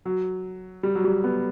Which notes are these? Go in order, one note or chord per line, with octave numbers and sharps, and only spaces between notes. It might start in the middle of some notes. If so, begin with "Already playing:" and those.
F#3
G3
F#3
G3
B3